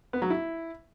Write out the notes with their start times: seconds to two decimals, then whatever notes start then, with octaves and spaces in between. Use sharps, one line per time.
0.13 B3
0.22 F#3
0.30 E4